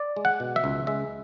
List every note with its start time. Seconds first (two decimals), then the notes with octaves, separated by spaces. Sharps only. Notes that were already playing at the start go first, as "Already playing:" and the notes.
Already playing: D5
0.17 G#3
0.25 F#5
0.40 B2
0.56 E5
0.64 C#2
0.87 G#3 E5